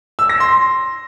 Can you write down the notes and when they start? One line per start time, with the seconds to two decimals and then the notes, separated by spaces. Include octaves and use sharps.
0.19 E6
0.30 A#6
0.40 C6